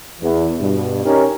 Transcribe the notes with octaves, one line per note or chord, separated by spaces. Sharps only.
E2 E3
G2 B2
C#4 D#4 G4 A#4